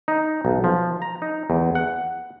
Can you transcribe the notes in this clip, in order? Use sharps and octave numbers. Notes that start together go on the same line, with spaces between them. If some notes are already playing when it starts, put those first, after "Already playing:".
D#4
B1
F3
A#5
D#4
E2
F#5